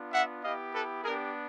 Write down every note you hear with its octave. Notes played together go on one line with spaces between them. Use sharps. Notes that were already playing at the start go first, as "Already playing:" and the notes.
Already playing: B3 D4 F4
E5 F#5
B3 E4 G4 D#5 F5
A4 B4
B3 D4 G4 G#4 A#4